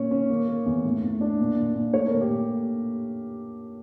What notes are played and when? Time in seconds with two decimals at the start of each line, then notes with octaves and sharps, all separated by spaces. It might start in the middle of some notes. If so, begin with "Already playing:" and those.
Already playing: A#2 C#4 C#5
0.11 C#4
0.30 A#3
0.47 A#3
0.66 E2
0.85 A2
1.03 A2
1.21 D4
1.39 A#2
1.57 A#2
1.75 A#2
1.94 A3 C#5
2.07 A#4
2.12 A#2
2.21 G4
2.30 A#2